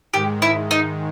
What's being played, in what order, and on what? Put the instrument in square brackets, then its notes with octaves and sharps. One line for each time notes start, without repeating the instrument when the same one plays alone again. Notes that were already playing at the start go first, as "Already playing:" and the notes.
[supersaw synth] G#2 D#3 G#3 [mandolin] G4
[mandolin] E4
D#4